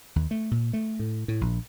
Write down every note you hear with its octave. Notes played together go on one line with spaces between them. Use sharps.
D#2
A3
A#2
A3
A2
A2
A#1